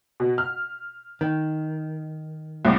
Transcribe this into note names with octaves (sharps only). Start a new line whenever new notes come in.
B2
F6
D#3
C2 A2 D6